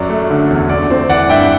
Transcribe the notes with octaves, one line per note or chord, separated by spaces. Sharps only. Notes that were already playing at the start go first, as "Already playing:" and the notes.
Already playing: F#2 F#3 D5
A3
D3
E2
A3 D5
C4
E3 D5 F#5
G2 E5 G5